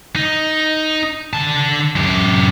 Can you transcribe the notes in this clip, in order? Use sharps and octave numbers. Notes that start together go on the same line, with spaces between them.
D#4
D3 A5
F#2 G4